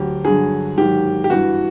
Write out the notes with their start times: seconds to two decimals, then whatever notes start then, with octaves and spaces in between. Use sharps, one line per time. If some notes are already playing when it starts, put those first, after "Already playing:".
Already playing: D2 D3 F#3 G4
0.25 G2 D3 F#3 G#4
0.78 G#2 D#3 F#3 G4
1.24 G4
1.30 G2 E3 F#4